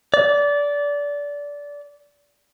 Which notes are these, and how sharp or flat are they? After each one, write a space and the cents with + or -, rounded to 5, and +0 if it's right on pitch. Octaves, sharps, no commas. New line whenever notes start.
D5 -20